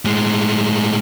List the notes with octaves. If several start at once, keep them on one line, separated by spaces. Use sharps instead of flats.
A2 G#3